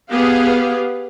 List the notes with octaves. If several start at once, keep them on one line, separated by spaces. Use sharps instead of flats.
B3 G4 G#4 F5